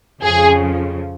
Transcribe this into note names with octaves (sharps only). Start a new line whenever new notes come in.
F2 C#3 F3 G#4